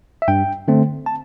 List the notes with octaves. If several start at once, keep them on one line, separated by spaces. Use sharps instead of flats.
E5
G2 G5
D3 A3 C4
A5